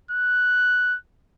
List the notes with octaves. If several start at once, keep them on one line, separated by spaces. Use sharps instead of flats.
F#6